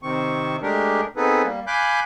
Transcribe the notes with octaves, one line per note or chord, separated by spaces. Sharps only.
C3 D#3 C4 C#6
G#3 A3 D4 G4 A#4
B3 C4 D#4 G#4 A4 B4
G3 A#3
F5 G#5 B5 D6 F#6 G6